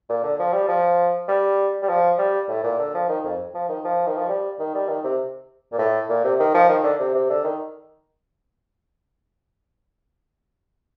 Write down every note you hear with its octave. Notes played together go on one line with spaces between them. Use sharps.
A#2
D3
F3
G3
F3
G3
G3
F3
G3
A2
A#2
D3
F3
D#3
F2
F3
D#3
F3
D#3
F3
G3
D#3
G3
D#3
C3
A#2
A2
A#2
C3
D#3
F3
D#3
D3
C3
C3
D3
D#3